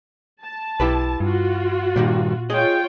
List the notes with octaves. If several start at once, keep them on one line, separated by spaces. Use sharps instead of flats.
A5
B1 E4 G4 B4
G2 F4 F#4
G2 A#2 D#3 G3
F4 G#4 C#5 D#5 G5